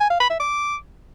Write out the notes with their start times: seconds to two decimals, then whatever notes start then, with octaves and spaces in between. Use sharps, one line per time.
0.01 G#5
0.10 F5
0.20 B5
0.30 E5
0.40 D6